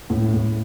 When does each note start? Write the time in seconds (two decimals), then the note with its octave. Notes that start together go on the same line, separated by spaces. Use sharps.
0.10 A2
0.34 A2